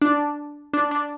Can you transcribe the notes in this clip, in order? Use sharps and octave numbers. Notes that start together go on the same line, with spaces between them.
D4
D4
D4